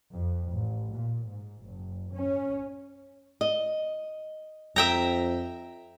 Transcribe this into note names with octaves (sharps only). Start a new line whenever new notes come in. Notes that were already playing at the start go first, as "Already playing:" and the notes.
F2
A1
A#2
G#2
F#1
C#4
D#5
F2 E5 G5 A#5